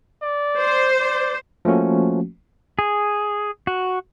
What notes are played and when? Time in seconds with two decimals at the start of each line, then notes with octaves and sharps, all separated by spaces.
0.23 D5
0.58 C5
1.00 D5
1.65 F3 A3 A#3 C#4 F#4
2.79 G#4
3.67 F#4